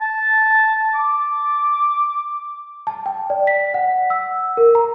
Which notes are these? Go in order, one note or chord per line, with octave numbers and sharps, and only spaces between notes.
A5
D6
A5
G5
D5
B6
F#5
E6
A#4
A#5